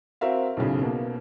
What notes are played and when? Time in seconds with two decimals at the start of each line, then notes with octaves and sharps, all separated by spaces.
0.21 C4 F#4 A#4 E5 F5
0.57 B1 A2 C#3
0.81 B2 A#3